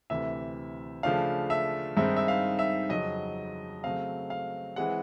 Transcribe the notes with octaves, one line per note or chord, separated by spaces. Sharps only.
D2 C3 E3 E5
C#3 F3 A3 D4 F5
E5
G2 D#3 G#3 C4 D#4 E5
E5
F5
E5
F2 C#3 F#3 D#5
C#3 F#3 A3 C4 F5
F5
E3 G#3 C4 F#5